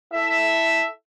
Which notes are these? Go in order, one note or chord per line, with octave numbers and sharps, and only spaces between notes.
E4 A4 E5